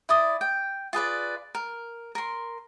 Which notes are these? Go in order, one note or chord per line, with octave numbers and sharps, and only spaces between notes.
E4 D5 D#6
G5
F4 G#4 B4 D5
A#4
A#4 C6